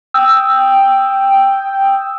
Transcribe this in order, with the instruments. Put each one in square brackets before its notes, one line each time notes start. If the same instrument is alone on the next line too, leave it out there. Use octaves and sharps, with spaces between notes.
[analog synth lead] G5 [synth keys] D#6 E6